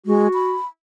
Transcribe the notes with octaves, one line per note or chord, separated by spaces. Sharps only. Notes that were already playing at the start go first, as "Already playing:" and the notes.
G#3 F#4
B5